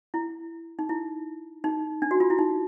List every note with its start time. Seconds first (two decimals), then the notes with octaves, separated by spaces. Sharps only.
0.14 E4
0.79 D#4
0.89 E4
1.64 D#4
2.02 D4
2.11 F#4
2.20 F4
2.30 E4
2.39 D#4